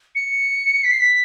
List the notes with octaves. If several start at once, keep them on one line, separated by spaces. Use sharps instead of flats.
C#7
B6
C7
B6